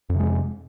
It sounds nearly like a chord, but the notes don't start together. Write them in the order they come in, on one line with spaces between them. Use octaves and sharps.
F2 C3 G#3